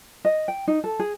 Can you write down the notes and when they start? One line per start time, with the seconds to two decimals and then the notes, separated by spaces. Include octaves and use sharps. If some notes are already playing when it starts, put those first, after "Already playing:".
0.25 D#5
0.48 G5
0.68 D#4
0.84 A4
0.99 G#4